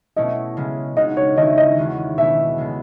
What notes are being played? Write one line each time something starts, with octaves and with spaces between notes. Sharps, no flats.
B2 A3 C#4 E4 D#5
C#3 G#3 C#4
C#3 G#3 D#4 F#4 D#5
C#5
D#3 A3 E4 D#5
D#5
E2 D#3 G#3 C#4 F#4
B2 A3 E4 E5
C#3 G#3 B3